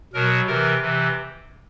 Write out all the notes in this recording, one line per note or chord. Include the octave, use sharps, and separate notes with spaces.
B2 F#3 A#4
C3 E3 A#4
C3 E3